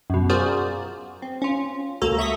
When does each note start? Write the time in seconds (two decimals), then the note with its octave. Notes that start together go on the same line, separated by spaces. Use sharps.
0.10 F#2 B2
0.29 F4 F#4 G#4 A#4 C5 D5
1.22 C4
1.42 C#4 F4
2.02 C#2 A#3 F#4 A4 A#5
2.18 E5 C#6 D#6 B6